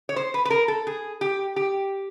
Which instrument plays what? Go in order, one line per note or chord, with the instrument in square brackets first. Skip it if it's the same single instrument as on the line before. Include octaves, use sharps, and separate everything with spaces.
[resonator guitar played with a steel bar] C#5
C5
B4
B4
A#4
A4
G#4
G4
G4